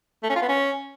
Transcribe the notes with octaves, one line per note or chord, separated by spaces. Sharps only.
A3
C#4
F4
B3
C#4